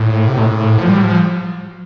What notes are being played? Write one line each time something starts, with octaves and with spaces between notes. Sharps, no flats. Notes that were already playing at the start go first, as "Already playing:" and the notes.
Already playing: A2
C3
A2
F3
G3
F3